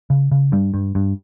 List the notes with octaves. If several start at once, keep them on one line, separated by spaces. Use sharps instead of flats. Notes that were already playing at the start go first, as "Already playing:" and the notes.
C#3
C#3
G2 G3
G2
G2